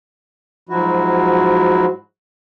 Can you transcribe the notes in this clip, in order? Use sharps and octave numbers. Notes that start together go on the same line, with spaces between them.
G#2 F3 F#3 E4 F#4